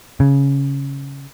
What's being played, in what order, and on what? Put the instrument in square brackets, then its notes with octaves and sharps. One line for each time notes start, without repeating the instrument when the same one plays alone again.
[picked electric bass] C#3